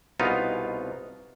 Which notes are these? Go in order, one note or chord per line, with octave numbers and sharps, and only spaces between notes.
C2 B2 B3 D#4 F4 F5